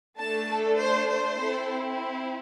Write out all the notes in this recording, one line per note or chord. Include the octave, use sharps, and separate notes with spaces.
A3 D4 A4 A5
A4
C5
C5
C4 E4 A4